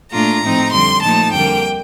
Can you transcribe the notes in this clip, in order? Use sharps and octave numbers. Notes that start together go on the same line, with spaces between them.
A#2 A3 D4 F4 A#5
A2 F3 C4 D#4
F2 D3 G3 C6
A#2 F3 A3 D#4 A5
F2 D3 G3 A#3 G5